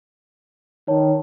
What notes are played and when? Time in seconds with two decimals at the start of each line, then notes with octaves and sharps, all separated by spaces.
0.88 D#3 C#5 A5